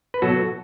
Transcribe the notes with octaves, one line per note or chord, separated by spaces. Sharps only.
B4
B2 F#3 F#4 A4